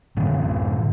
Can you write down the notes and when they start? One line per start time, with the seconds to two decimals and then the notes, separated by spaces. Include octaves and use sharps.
0.17 A2 D3 E3